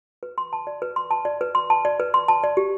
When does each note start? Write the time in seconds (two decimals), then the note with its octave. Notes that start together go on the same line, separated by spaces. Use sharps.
0.23 B4
0.38 C6
0.53 A5
0.67 D5
0.82 B4
0.96 C6
1.11 A5
1.25 D5
1.41 B4
1.55 C6
1.70 A5
1.85 D5
2.00 B4
2.14 C6
2.28 A5
2.44 D5
2.57 G4